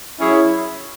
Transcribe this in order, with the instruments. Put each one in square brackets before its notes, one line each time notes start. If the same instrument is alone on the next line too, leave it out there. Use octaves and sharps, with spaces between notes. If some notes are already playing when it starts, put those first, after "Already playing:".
[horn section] F#3 C#4 G#4 C#5 [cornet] E4